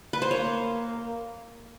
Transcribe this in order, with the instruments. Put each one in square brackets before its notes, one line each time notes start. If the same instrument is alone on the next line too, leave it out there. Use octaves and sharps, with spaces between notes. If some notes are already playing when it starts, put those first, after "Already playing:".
[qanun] B4
C5
[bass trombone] A#3 [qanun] C#5